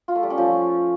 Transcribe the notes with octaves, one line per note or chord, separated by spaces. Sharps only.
F4
A3
G3
C#4
F3